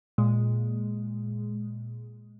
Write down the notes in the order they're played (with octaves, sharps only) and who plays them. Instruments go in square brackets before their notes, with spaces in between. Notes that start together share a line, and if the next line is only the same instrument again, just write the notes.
[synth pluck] A#2 G#3